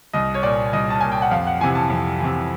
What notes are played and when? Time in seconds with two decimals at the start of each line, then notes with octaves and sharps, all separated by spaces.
0.13 C2 D#5
0.34 C#5
0.43 A#2 D5
0.73 C2 D#5
0.90 A5
1.01 A#2 G#5
1.12 G5
1.22 F#5
1.31 F2 F5
1.47 F#5
1.60 C3 E3 G#5
1.75 A5
1.90 F2
2.20 C3 E3